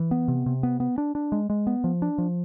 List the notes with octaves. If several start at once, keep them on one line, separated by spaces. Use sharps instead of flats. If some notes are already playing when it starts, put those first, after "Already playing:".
Already playing: E3
B3
C3
C3
B3
B3
D4
D4
G#3
G#3
B3
F3
D4
F3